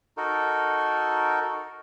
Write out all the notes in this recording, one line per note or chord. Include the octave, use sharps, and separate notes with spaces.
D#4 F#4 A4 A#4